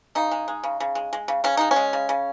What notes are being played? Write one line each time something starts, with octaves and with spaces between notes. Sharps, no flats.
C#3 D#4
G#3
G#3
C#3
C#3
G#3
G#3
C#3
C#3 C#4
G#3 D#4
C#4
G#3
C#3
C#3